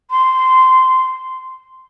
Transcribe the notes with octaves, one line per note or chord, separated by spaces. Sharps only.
C6